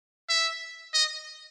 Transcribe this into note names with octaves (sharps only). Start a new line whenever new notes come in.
E5
D#5